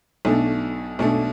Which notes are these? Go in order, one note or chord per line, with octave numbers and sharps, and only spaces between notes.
B1 B2 A3 D4
B1 B2 A3 D4